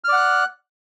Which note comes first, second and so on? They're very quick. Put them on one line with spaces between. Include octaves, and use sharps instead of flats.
F6 D5 F#5 F#6